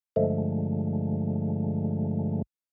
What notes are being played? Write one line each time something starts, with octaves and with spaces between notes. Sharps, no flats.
G2 D3 F3 G#3 A3